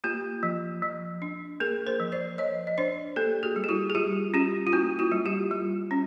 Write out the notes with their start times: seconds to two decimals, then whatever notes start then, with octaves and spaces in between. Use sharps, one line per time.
0.04 A#3 F4 G4
0.43 F3
0.82 F3
1.22 D4
1.60 A#3 G#4 A#4
1.86 A#4 C5
2.00 F3
2.12 C5 D5
2.38 F3 C#5 D#5
2.67 D#5
2.78 D4 C5 D5
3.16 A#3 G4 A4
3.43 F#4 G#4
3.56 G3
3.64 G4
3.69 E4 F#4
3.90 G#4
3.95 G3 F4 G4
4.34 C#4 F4 G4
4.67 F4
4.72 A#3 E4 F#4
4.99 E4 F#4
5.12 G3
5.25 F4 G4
5.51 G3
5.91 C#4